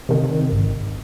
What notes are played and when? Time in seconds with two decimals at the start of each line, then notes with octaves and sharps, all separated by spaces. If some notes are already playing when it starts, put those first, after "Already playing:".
0.09 C3 D#3
0.51 G#1